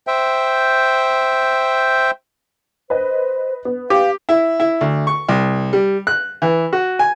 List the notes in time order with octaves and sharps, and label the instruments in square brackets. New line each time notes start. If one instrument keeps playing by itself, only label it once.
[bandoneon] C5 E5 G5
[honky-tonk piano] B4 D#5 [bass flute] C5
[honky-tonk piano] B3
[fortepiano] G4 [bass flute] F5
[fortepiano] E4
E4
D2
C#6
C2
G3
F#6
E3
F#4
G#5